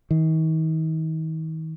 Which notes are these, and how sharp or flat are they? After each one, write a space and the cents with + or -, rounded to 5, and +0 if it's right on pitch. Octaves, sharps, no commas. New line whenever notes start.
D#3 +40